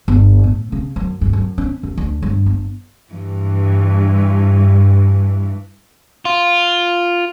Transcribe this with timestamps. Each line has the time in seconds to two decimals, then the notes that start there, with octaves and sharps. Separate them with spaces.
0.08 G1
0.44 A2
0.72 C#3
0.96 F#2
1.21 G2
1.33 F#2
1.58 C#4
1.83 F#2
1.98 D2
2.22 G2
2.46 G1
3.11 G2 E3
6.25 F4